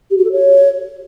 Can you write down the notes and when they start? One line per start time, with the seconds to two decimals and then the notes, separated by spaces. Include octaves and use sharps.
0.10 G4
0.17 F#4
0.24 A4
0.31 C#5